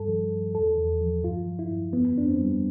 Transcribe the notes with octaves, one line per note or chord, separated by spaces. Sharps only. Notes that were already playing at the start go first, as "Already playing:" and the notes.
Already playing: G2 G3 A4
F3
G2
E2 A4
E2
F3
G2 F4
F3
E4
G2
F2 B3
F2 D4
C4
G3